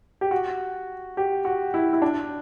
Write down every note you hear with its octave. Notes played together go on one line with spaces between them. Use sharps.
G4
F#4
G4
F#4
E4
E4
D4